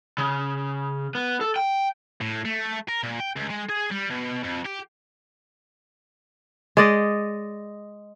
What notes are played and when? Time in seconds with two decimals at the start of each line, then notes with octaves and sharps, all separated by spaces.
0.18 C#3
1.15 B3
1.41 A4
1.56 G5
2.21 A2
2.45 A3
2.89 A#4
3.03 A#2
3.20 G5
3.36 C#2
3.50 G#3
3.69 G#4
3.91 G3
4.10 B2
4.43 F2
4.65 G4
6.77 G#3 D5 D#5